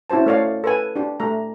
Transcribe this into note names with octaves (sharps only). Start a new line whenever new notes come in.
C#4 E4 F#4 C5 A5
A3 A4 C#5 D5 F5
A4 B4 G#5
D4 G4
A3 G4 A#5